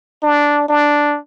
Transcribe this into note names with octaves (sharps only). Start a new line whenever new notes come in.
D4
D4